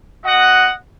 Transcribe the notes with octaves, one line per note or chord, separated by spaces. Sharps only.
B3 F#4 D#5 F#5